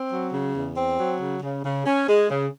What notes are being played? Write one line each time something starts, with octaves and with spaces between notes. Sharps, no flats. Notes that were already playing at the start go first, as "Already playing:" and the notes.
Already playing: C4
F#3
C#3
E2
C4
F#3
C#3
C#3
C#3
C#4
G#3
C#3